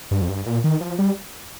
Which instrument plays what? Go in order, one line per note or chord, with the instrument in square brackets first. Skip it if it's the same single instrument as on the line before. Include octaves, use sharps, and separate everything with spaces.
[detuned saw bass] G2
F2
G2
A#2
D#3
F3
G3